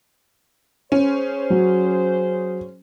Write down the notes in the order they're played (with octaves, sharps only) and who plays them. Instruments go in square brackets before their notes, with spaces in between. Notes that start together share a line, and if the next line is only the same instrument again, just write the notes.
[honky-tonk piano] C#4 [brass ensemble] G#4 C5
[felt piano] F#3